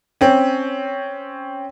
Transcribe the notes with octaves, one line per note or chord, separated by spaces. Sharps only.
C4 C#4